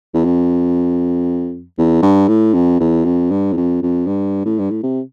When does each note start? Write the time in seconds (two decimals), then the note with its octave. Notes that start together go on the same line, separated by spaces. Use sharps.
0.14 E2
0.25 F2
1.78 E2
2.03 G2
2.28 A2
2.54 F2
2.80 E2
3.05 F2
3.31 G2
3.53 E2
3.57 F2
3.82 F2
4.07 G2
4.45 A2
4.59 G2
4.71 A2
4.83 C3